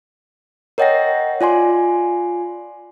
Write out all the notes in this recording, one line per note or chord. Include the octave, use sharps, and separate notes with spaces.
A#4 C#5 D#5 F#5 G5 A#6
F4 D5 G#5 C6